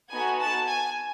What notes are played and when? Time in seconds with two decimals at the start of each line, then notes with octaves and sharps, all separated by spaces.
0.10 B3 D#4 F#4 A4 G#5
0.39 A5
0.67 G#5